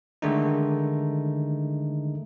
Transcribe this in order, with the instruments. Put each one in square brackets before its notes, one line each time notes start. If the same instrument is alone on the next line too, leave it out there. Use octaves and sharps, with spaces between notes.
[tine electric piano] D3 D#3 G#3 A3 D4 D#4